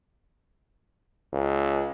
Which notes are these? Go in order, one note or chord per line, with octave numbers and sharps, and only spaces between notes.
C#2